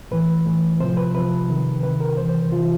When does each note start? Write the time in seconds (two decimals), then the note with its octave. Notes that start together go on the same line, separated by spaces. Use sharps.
0.11 A2 E3 B4
0.46 A2 E3
0.80 C3 F3 C5
0.97 B4
1.15 C3 F3 B4
1.49 C3 D#3
1.83 C3 D#3 B4
2.00 A#4
2.17 C3 E3 C5
2.29 C5
2.52 C3 E3 F4